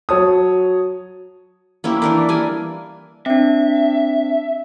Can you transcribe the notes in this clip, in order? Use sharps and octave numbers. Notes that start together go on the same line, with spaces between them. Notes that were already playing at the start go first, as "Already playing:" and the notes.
F#3 C#5 A5 D#6
A#3 C#4 E4 G4
E3 D4 A#4
G3 D4 A#4 G#5
C4 D4 E5